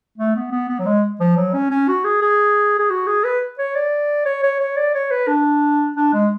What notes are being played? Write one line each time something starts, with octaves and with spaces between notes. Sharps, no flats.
A3
B3
B3
B3
F#3
G#3
F3
F#3
C#4
C#4
F#4
G#4
G#4
G#4
F#4
G#4
B4
C#5
D5
C#5
C#5
C#5
D5
C#5
B4
D4
D4
G#3